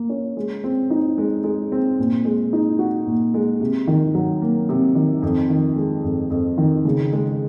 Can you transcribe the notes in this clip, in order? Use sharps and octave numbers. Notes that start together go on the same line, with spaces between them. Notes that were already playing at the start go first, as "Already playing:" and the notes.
Already playing: A#3
C#4
G#3
C4
D#4
G#3
G#3
C4
A#2
G#3
D#4
F#4
A#2
G#3
C3
D#3
F#3
A#3
C3
D#3
F2
D#3
G#3
F2
F2
D#3
C#3
G#3